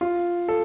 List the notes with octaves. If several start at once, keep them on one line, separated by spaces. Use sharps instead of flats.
F4
A4